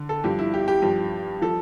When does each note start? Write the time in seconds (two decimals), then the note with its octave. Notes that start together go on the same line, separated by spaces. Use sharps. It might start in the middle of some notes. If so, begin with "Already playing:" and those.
Already playing: D3
0.09 A4
0.24 G2 F3 G4
0.39 E4
0.54 G4
0.68 G4
0.82 G2 F3
1.42 F3 A4